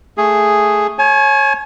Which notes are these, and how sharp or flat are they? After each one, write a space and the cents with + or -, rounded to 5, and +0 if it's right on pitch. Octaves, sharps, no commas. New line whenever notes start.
A3 +0 G#4 +0
C#5 -20 G#5 +35